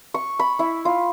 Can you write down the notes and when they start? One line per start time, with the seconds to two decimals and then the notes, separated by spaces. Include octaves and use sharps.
0.14 C#6
0.39 B5
0.59 E4
0.85 F4